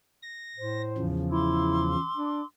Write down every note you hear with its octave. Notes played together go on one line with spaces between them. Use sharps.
A#6
A2 C5
E2 C#3 F3
E4 C6 D6 E6
D4